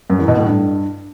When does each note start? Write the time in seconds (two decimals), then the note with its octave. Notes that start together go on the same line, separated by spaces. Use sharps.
0.10 F#2
0.19 E2
0.28 B2
0.37 A2
0.46 G2